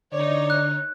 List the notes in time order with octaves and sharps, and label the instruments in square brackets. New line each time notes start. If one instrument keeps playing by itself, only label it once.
[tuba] D3 [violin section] D#4 C#5 [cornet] D5
[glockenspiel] F#6